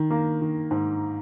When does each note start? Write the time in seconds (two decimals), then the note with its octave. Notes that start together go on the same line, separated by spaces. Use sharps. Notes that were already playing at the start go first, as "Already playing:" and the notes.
Already playing: D#3
0.10 A#3
0.41 D#3
0.71 G#2